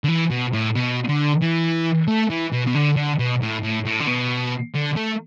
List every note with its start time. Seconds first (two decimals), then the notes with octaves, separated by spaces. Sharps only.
0.04 D3
0.08 E3
0.30 B2
0.53 A2
0.75 B2
1.08 D3
1.41 E3
2.08 A3
2.30 E3
2.53 B2
2.67 B2
2.75 D3
2.96 D3
3.19 B2
3.42 A2
3.63 A2
3.86 A2
4.01 D3
4.07 B2
4.74 D3
4.96 A3